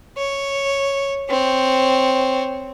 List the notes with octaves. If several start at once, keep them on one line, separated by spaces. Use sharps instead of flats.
C#5
C4 C#5